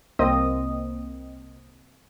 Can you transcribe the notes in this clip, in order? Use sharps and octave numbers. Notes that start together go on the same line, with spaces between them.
C2 A#3 C4 D#5 D#6